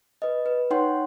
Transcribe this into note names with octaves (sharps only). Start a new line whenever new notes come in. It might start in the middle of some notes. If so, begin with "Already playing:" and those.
B4 D#5
B4
D#4 C#5 F#5 G5 C6